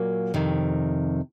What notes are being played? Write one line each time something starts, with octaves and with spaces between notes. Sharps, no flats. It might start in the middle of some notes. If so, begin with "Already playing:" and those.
Already playing: A#2 F#3 A#3
F2 C3 D#3